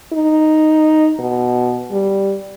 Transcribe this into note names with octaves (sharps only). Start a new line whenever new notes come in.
D#4
B2
G3